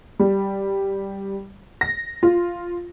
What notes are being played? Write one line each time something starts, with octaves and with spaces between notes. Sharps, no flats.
G3
A#6
F4